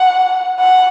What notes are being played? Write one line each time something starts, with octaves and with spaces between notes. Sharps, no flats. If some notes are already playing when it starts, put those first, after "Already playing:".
Already playing: F#5
F#5